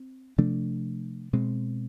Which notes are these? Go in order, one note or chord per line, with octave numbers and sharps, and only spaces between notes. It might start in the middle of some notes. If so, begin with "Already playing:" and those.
Already playing: C4
C3 F3 A3 D4
B2 G#3 C4